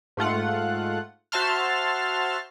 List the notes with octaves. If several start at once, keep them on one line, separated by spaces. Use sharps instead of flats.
G#2 A3 F4 F#5
F#4 C5 E5 A5 C6 F6